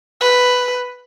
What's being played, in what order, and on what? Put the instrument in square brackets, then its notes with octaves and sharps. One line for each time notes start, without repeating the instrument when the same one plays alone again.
[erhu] B4